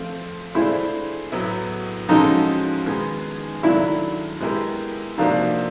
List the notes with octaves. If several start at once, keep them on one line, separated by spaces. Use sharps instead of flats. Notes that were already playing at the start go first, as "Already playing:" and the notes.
Already playing: F3 A3 C4 F4
A3 D4 E4 F4 G#4 C5
A2 F#3 B3 E4
F3 G#3 C#4 D#4 F#4 A4
D#3 G#3 B3 D#4 G#4
D#3 F#3 A3 D4 E4 F4
G#3 B3 E4 G4 A#4
C3 F3 A#3 D4 D#4 F#4